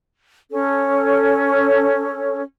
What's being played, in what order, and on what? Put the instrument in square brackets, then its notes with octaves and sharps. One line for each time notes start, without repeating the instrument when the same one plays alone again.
[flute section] C#4 A4